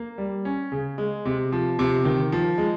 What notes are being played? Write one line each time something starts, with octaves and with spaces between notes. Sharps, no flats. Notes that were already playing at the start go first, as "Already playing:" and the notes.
Already playing: A#3
G3
C#4
C#3
G#3
C3
F3
C3
D#3
F3
G#3